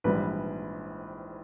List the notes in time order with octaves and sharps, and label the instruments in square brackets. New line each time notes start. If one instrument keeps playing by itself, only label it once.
[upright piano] A#1 G#2 E3 G3 B4